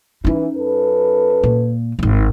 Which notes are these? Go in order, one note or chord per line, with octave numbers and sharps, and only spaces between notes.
E3 C#4 D#4
F#2 A4 B4
A#2
D#1 G#1